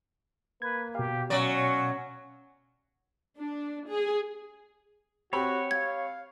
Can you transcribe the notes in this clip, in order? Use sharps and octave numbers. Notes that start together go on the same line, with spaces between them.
A#3 B4 G#6
B2 G4 F5
F#3 C#4 D5 C#6
D4
G#4
C4 F#4 G4 C#5 B5
F5 G#6